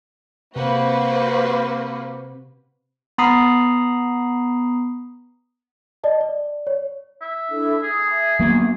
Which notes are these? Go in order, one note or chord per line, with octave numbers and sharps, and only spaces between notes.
C3 A#3 F#4 B4 C5
B3 A#5 B5 D#6 C7
D5 D#5 A5
D5
C#5
E5
D4 E4 A4
G#4 D#6
E5
F#3 A#3 B3 F#4 A#5